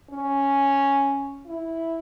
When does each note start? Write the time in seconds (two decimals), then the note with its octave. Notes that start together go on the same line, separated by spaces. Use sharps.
0.11 C#4
1.46 E4